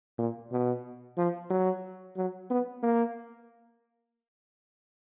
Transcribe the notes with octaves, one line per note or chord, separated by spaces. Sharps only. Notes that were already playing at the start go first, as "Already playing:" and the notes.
A#2
B2
F3
F#3
F#3
B3
A#3